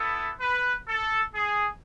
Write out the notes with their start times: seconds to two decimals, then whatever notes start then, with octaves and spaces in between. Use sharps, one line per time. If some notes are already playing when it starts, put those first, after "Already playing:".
Already playing: B3 E4 A4
0.40 B4
0.88 A4
1.34 G#4